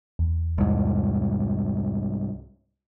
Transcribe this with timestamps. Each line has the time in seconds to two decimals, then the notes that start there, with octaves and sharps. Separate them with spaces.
0.19 E2
0.58 C2 G#2